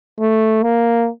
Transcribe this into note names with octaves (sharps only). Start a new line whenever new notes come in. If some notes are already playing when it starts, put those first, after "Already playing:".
A3
A#3